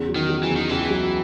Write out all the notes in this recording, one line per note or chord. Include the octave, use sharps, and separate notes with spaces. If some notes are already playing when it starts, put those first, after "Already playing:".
Already playing: E2 C#3
F#3
D#3
F#3
E3
E2
D#3
C#2 E3
F#3